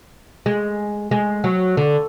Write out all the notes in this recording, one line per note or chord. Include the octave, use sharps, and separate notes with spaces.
G#3
G#3
F#3
D3